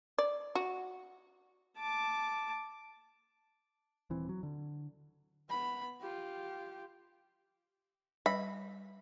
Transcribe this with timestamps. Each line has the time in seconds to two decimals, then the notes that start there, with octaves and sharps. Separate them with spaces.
0.18 D5
0.55 F#4
1.78 A5 D6
4.10 D#1 E3 C4
4.29 F#3
4.43 D3
5.49 B3 B5
6.01 F4 G4
8.26 G3 B4 D#5 E5 B5